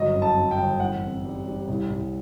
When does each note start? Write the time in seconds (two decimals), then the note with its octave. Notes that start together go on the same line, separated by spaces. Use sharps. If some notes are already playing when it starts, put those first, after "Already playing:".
Already playing: G1 F#3 D#5
0.15 F#2
0.22 A5
0.36 F#2
0.51 G5
0.58 G1
0.80 A1 F#5
1.02 C4
1.24 G3
1.46 G3
1.69 C2
1.90 C2